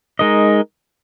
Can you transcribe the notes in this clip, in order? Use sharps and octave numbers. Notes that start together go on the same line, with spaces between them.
G#3 D#4 A#4 D#5